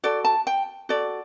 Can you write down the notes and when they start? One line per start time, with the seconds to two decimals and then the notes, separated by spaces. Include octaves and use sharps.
0.04 F#4 A4 D5
0.24 A5
0.47 G5
0.89 F#4 A4 D5